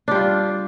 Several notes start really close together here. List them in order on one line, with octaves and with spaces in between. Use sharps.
D4 G3 F4